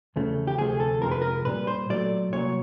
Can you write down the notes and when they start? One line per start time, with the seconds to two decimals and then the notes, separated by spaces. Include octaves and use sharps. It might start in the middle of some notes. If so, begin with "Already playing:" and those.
0.16 E2 C#3 F3 A3
0.47 G4
0.58 D2 C3 F3 A3 G#4
0.80 A4
1.02 F2 C3 F3 G#3 A#4
1.11 B4
1.22 A#4
1.45 A#2 G3 B4
1.67 C5
1.89 A#2 F#3 A3 D5
2.33 C2 A#2 F#3 C#5